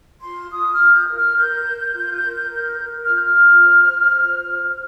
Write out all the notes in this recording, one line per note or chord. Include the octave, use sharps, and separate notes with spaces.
F4 C6
F4 D#6
F6
F4
G6
A#4
F6
A#4 G6
A#4
F4
A#4
A#4
A#4
F4 F6
G6
F6
F4
C5
C5
F4
C5